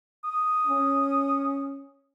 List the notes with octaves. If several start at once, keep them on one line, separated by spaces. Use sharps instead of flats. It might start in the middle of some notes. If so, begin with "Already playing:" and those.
D#6
C#4